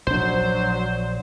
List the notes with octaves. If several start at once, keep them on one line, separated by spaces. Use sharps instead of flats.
A#1 F#3 D4 C5